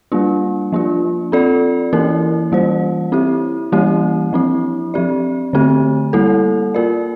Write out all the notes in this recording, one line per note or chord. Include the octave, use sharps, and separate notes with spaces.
G3 A#3 D4 F4
F3 A#3 D4 F4
C4 F4 A4 D5
E3 A#3 E4 A#4
E3 G3 A#3 F4 C5
C4 E4 G4
E3 G3 A#3 E4 G4
F3 C4 E4
F3 C4 G4 D5
D3 A3 C4 G4
G3 A#3 E4 A4
A#3 F4 A#4 D5